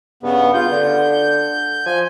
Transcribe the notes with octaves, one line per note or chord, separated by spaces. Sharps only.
G2 C#3 B3
F4 G6
D3
F3 G#5